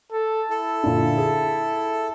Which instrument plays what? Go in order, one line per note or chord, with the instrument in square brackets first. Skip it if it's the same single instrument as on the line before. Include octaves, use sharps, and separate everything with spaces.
[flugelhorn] A4
[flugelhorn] E4 [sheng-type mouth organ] A4
[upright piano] A#2 D3
G#4